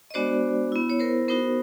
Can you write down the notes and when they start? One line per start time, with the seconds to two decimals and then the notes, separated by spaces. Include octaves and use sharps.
0.11 D#5
0.14 G#3 B3 D4 F#4 C5 D5
0.72 B3 E4
0.90 C#5
0.99 A#4 C5
1.28 B3 D#4 F#4 A#4 C5